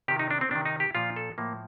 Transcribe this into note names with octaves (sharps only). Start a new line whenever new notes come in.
C3 D#3 G4
D#4
D4
C4
C3 D#3 D4
D#4
G4
A#2 F3 F4
A4
A2 F3 A#3